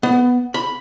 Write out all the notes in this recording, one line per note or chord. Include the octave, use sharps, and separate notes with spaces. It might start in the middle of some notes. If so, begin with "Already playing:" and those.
B3
B5